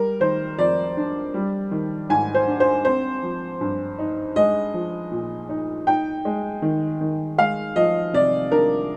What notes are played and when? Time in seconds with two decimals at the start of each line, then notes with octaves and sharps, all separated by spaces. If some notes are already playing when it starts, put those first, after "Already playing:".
Already playing: G3 A#4
0.20 D#3 C5
0.58 F2 D5
0.97 D4
1.34 G3
1.71 D#3
2.09 G#2 G#5
2.35 C5
2.48 D4
2.60 C5
2.85 C4 C5
3.23 F3
3.61 G2
3.99 D#4
4.36 G#3 D#5
4.74 F3
5.11 A#2
5.49 D#4
5.87 D#4 G5
6.25 G#3
6.62 D#3
7.01 D#3
7.38 G#3 F5
7.76 F3 D#5
8.13 C3 D5
8.51 D4 A#4